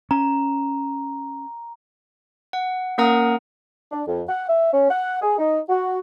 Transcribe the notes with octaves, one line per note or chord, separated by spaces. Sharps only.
C#4 A#5
F#5
A#3 C#4 A#4 F#5 A#5 D#6
D4
F2
F#5
E5
C#4
F#5
G#4
D#4
F#4